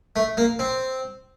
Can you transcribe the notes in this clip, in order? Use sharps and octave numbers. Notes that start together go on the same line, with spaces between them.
A3
A#3
C4